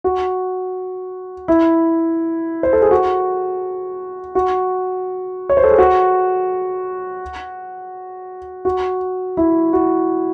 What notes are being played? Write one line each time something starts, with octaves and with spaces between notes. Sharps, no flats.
F#4
E4
C5
A4
G#4
F#4
F#4
C#5
C5
A4
G#4
F#4
F#4
E4
F#4